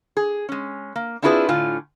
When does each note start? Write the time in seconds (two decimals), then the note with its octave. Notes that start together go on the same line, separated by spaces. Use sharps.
0.17 G#4
0.49 G#3 C#4
0.96 A#3
1.22 C4 D4 E4 F4 G#4 B4
1.49 A2 D3 F4 G#5